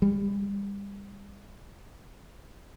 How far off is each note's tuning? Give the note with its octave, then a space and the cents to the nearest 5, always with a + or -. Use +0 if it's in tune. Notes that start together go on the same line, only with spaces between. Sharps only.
G3 +35